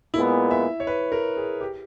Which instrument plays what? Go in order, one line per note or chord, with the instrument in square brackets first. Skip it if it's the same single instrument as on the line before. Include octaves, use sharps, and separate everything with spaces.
[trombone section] A#2 G#3 B3 [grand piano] E4
[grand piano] E5
C#5
B4
A#4
G#4
G4